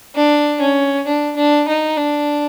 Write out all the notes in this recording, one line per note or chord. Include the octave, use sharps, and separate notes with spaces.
D4
C#4
D4
D4
D#4
D4